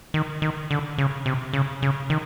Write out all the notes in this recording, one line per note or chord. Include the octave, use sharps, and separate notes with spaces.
D#3
D#3
D3
C#3
C3
C#3
C#3
D#3